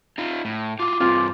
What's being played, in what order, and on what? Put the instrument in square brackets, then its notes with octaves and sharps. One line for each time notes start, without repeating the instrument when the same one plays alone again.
[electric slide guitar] D#4 F4
A2
[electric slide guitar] F4 F#4 [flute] D6
[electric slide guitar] G2 B2 C4 [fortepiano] F4